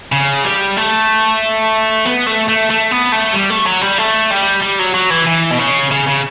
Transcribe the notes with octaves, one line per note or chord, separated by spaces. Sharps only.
C#3
G3
A3
B3
A3
A3
A3
B3
A3
G3
A3
F#3
G3
A3
G3
G3
F#3
F#3
E3
E3
B2
C#3
C#3
C#3